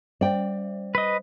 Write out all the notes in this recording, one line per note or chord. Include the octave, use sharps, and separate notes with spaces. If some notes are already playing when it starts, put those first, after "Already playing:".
G3 C5 D5 G5
B4 D#5